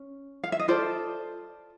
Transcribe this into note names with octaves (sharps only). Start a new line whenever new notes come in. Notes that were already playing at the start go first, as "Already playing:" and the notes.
Already playing: C#4
F5
E5
D#5
F4 A4 C5 D5